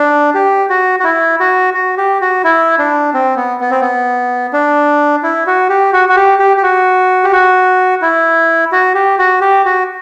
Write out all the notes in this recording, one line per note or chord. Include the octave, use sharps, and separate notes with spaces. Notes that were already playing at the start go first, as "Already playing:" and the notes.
Already playing: D4
G4
F#4
F#4
E4
F#4
F#4
G4
F#4
E4
D4
C4
B3
B3
C4
B3
D4
E4
F#4
G4
F#4
F#4
G4
G4
G4
F#4
G4
F#4
E4
F#4
G4
F#4
G4
F#4